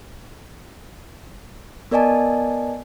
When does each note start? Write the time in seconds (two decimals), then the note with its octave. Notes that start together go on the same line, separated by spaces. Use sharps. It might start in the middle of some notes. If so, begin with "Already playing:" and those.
1.91 B3 A#4 D5 D#5 G#5 A5